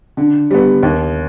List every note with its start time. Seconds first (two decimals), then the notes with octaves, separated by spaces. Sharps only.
0.17 D3
0.51 G3 B3
0.83 D#2